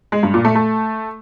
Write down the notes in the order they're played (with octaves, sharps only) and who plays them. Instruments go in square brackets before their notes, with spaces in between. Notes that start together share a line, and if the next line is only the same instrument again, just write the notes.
[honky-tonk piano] G#3
G2
A#2
A3
A3